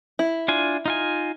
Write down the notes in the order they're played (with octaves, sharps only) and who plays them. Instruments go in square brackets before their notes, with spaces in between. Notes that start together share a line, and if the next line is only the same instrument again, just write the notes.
[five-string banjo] E4
[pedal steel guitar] D4 F4 G#5
D#4 F4 G#5